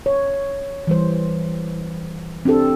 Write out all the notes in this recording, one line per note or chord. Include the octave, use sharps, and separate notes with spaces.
C#5
E3 G3 C5
C4 D4 G4 A4